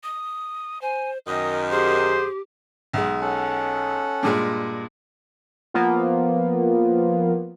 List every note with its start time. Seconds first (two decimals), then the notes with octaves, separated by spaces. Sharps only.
0.04 D#6
0.82 C5 G#5
1.27 F#2 D#3 D#5 D#6
1.71 G4 G#4 C5
2.93 B1 G#3
3.21 C#4 A4 F#5
4.23 G2 A#2 G#3
5.74 F3 A#3 B3 F4